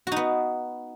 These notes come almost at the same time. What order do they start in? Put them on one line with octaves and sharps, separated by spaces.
F#4 D#4 B3